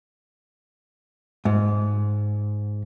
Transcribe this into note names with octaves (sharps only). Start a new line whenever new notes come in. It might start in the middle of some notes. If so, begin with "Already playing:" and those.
G#2